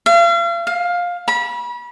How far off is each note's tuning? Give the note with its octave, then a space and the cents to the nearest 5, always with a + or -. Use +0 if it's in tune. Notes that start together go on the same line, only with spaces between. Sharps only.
F5 -40
F5 +15
B5 -30